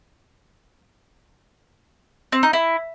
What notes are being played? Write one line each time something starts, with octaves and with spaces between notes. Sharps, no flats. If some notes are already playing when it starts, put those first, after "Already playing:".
C4
D#4
E4